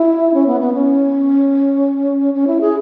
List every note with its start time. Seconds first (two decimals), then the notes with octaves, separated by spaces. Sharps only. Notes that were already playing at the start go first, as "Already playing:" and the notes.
Already playing: E4
0.34 C#4
0.47 B3
0.60 B3
0.74 C#4
2.34 C#4
2.47 E4
2.61 G#4